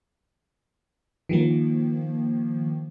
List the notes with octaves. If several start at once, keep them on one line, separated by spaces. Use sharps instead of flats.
D#3 F3 A#3